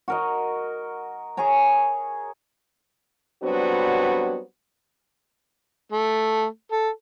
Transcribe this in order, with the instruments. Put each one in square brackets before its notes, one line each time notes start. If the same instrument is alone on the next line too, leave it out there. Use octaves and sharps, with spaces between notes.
[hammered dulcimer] F#4 A#4 D#5
G#4 C#5 G#5 A#5
[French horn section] F#3 G3 B3 C4 D4 F#4
[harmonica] A3
A4